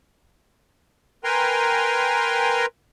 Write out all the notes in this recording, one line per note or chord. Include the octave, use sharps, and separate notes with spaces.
A#4 B4 G5 G#5 A#5 C6